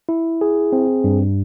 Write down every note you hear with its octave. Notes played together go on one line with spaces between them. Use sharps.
E4
G#4
C4
G2